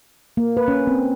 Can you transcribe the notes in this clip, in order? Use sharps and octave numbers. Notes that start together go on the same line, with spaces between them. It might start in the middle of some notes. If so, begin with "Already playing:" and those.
A#3
B4
C#4
C4